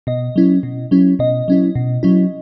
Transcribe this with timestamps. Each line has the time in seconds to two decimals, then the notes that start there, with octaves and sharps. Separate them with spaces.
0.07 B2 D#5
0.36 F#3 C#4 E4
0.63 B2
0.91 F#3 C#4 E4
1.19 B2 D#5
1.48 F#3 C#4 E4
1.75 B2
2.03 F#3 C#4 E4